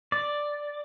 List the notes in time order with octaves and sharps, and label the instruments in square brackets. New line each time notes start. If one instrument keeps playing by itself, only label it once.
[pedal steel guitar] D5